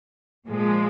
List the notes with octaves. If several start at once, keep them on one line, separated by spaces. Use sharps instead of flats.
A#2 F3 G#3